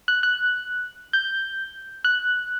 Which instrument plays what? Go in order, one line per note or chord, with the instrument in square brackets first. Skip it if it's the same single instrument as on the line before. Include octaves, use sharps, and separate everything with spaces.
[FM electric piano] F#6
F#6
G6
F#6